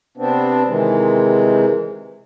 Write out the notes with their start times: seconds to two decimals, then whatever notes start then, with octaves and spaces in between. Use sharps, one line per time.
0.17 C3 B3 C4 D4
0.67 C3 D#3 E3 G#3